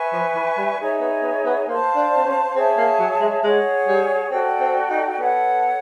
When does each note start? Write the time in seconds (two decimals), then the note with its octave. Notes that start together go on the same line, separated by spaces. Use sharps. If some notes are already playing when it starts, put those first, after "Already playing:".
Already playing: B4 E5 G#5 C#6
0.13 F3
0.35 E3
0.57 G3
0.79 D#4 G#4 C#5 E5
1.01 B3
1.23 B3
1.46 B3
1.67 A#3 C5 F5 A5
1.96 D4
2.17 C4
2.26 C#4
2.55 C4 G#4 C#5 E5 A5
2.77 A#3
2.99 F#3
3.21 G#3
3.43 G#3 G#4 C#5 F#5
3.88 G3
4.31 C4 F#4 A4 D5 G5
4.60 C4
4.90 D#4
5.20 B3 A4 C#5 F#5